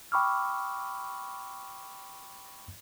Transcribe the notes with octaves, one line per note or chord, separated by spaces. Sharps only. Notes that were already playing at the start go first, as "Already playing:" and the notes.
G5 B5 C#6 D6 E6 F6